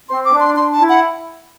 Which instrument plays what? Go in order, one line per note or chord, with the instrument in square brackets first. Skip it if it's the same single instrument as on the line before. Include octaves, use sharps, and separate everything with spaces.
[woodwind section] C4 [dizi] C6
[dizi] D6
[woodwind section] D4
[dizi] C6
[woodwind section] D4 [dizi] C6
[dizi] A5
[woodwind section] E4
[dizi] F#5